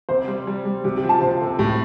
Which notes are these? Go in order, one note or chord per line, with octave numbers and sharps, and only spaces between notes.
C3 C5
G3
G3
G3
C3 G4
G4
F3
A5
C3 C5
C3 A4
A2 G4